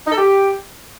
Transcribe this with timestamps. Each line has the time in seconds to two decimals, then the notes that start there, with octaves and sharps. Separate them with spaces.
0.07 D#4
0.12 A4
0.18 G4